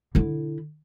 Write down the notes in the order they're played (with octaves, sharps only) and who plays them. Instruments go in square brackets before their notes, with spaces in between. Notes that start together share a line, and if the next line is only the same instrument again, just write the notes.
[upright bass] D3 E4